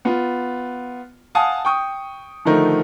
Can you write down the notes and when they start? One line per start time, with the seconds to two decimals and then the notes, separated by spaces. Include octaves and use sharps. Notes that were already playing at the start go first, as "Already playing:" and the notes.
0.05 B3 F4
1.35 F5 F#5 G#5 A5 D#6
1.65 G5 C#6 D#6
2.45 D3 D#3 F3 A3 D#4 A#4